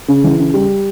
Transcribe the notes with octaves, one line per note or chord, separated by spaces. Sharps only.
C#3
E3
C#3
G3